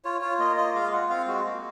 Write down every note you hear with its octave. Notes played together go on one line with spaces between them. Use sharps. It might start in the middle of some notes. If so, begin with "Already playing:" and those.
F4 C#5
F4 C#5
A#3 D#5
F4 D#5
G#3 F5
F4 F#5
C4 F5
G#3 F#4
A#3